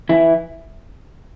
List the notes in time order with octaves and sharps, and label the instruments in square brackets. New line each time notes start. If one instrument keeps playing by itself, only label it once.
[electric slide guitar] E3 E4